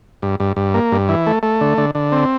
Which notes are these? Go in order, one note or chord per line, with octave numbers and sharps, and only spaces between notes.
G2
G2
G2
A#3
G2
E3
A3
A3
D3
D3
D3
C4